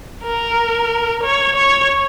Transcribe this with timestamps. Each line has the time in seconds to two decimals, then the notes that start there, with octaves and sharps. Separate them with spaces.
0.24 A#4
1.23 C#5
1.56 C#5